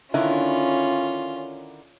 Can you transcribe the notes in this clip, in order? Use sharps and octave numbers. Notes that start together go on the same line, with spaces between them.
D3 D#3 C#4 E4 F4